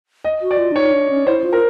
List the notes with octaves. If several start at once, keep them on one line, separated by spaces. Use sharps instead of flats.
D#5
F#4
D5
F4
D4
D#4 C#5
D4
C#4
E4 C5
F4
A#4